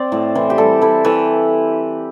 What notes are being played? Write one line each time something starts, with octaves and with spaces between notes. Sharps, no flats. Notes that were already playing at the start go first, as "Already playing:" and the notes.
Already playing: C4 C5 D5
A2
E3 C5
G4
G3 A4
E4 A4
E3 A4